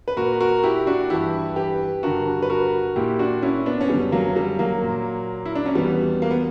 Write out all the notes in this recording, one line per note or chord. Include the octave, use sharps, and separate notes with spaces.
B4
A#2 F#4 A#4
F#4 A#4
E4 G4
D4 F#4
G2 E3 E4 G4
G4 B4
G2 D3 F#4 A#4
B4
F#4 A#4
A#2 E4 G4
D4 F#4
C#4 E4
B3 D4
C#4
F#2 D3 G3 B3
F#3 A#3
A#3
G3
F#3 A#3
A#2
E4
D4
C#4
E2 B2 G3 B3
A#3
B3